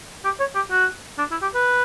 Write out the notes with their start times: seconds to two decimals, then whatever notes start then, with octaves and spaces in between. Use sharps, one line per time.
0.25 G4
0.40 C#5
0.55 G4
0.71 F#4
1.19 D4
1.31 E4
1.42 G4
1.54 B4